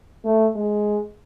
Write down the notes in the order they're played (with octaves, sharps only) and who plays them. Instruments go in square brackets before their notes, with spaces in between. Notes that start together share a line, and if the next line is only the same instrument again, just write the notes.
[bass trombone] A3
G#3